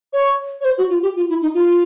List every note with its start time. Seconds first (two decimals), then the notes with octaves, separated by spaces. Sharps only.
0.13 C#5
0.60 C#5
0.64 C5
0.78 F#4
0.89 F4
1.02 G4
1.16 F4
1.29 E4
1.41 D#4
1.54 F4